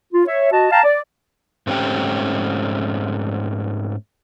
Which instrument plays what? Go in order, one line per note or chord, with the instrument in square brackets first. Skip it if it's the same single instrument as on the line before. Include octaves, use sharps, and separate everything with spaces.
[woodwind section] F4
C#5 E5
F#4 D#5 A5
F5 G5 A5 A#5
D5
[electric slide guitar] G#2 A3 C4 C#4 G4 G5